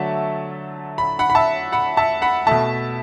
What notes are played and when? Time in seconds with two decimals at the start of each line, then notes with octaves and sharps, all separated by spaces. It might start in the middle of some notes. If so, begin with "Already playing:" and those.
Already playing: D3 F#3 A3 E5 A5
0.98 B5
1.19 F#5 B5
1.30 B5
1.35 E5 A5
1.72 F#5 B5
1.97 E5 A5
2.22 F#5 B5
2.47 B2 A3 E5 A5